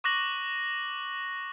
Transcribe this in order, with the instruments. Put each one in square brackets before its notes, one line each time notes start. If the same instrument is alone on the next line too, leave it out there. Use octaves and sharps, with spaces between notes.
[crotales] C#6 D6 F#6 A#6 F#7